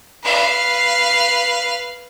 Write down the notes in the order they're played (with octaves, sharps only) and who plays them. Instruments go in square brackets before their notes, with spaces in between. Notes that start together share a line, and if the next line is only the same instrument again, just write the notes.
[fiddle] B4 F5